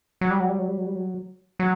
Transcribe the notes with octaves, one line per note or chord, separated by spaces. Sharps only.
F#3
G3
F#3
G3
F#3
G3
F#3
G3
F#3
F#3